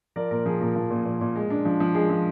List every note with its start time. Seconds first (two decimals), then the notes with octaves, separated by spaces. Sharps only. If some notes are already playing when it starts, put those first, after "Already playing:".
0.16 F3 A#4 D5
0.31 A#2 A#4
0.46 F3 G#4
0.61 A#2 A#4
0.76 F3
0.91 A#2
1.05 A#2
1.21 A#2
1.36 G#3
1.50 D4
1.65 F3
1.80 F3
1.94 G#3 G#4
2.10 F3